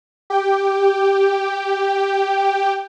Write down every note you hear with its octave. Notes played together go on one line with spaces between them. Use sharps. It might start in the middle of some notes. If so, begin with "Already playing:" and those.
G4 G5